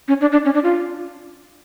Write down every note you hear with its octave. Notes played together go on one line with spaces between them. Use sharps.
C#4
D4
D4
C#4
D4
F4